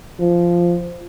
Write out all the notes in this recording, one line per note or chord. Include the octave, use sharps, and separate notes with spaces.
F3